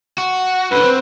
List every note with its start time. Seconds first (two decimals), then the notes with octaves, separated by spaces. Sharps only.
0.18 F#4
0.71 F#2 D3 B4
0.83 C4